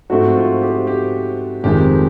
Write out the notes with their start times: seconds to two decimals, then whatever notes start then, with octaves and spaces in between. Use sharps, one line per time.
0.10 G#2 F3 A3 C4 F#4
0.35 F4
0.62 G4
0.87 G4
1.63 F1 F2 C3 D#3 G#3 G4